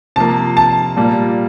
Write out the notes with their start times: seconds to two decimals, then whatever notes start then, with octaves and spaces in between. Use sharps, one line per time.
0.16 C3 F3 A#3 A5
0.57 A5
0.97 A#2 G3 A#3